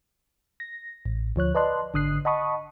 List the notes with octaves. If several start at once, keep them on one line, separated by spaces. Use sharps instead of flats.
A#6
A1
D2 F3 C#5 F#6
B4 D5 D#5 A5 C6 F#6
G#1 D3 D#6 F#6 C7
D#5 F#5 A5 B5 C#6 D#6